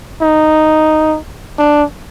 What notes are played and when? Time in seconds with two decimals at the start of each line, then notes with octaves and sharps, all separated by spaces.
0.21 D#4
1.59 D4